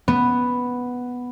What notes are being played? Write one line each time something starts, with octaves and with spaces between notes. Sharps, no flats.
B3